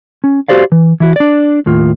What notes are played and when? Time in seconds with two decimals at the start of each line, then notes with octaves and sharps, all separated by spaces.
0.24 C#4
0.48 F#4 G4 C5 D5 F5
0.72 E3
1.00 E3 E4 F#4
1.16 D4 D5
1.66 D#2 A2 F4